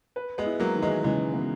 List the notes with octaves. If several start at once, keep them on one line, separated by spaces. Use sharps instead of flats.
B4
G#3 B3
E4
F#3 A#3
D#3
E3 G#3
C#3 E3 G#3
B3